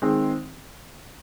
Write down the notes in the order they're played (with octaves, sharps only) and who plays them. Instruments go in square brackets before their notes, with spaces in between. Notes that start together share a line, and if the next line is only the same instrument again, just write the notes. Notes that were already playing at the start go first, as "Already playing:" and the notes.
[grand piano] D#3 G#3 C4